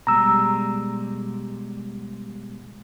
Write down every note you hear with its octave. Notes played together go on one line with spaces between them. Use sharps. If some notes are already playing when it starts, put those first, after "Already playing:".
B2 G3 G#3 A#5 E6